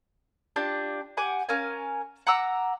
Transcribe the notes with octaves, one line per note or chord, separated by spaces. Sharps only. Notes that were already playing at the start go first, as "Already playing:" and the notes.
D4 F4 G4
G4 F#5 G#5 D6
C#4 A#4 F5 G#5
F#5 A#5 D6 E6